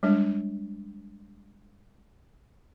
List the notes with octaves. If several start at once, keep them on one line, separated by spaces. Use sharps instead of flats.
G3 G#3 D4